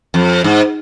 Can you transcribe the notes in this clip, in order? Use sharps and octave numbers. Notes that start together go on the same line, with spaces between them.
F2
G#2